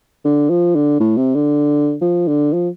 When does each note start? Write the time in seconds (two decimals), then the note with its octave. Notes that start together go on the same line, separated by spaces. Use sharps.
0.25 D3
0.50 F3
0.75 D3
1.00 A2
1.17 C3
1.35 D3
2.02 F3
2.28 D3
2.53 F3